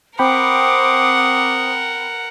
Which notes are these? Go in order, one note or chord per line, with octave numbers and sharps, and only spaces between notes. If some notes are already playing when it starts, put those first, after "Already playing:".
C4 A#4 C5 F#5 G5 B5 D6 D#6